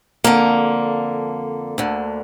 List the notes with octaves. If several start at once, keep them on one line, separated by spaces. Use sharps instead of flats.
F2 D3 A#3
D2 D3